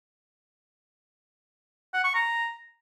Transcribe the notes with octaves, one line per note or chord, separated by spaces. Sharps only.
F#5
C#6
A#5